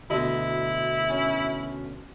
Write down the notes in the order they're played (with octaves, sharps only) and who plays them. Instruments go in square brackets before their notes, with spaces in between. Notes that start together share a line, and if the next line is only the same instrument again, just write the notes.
[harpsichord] D2 B2 [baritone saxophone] E4 [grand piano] D#5
[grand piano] C#4